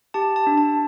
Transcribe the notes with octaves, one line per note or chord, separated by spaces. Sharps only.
G4 A5
A5
D4
A5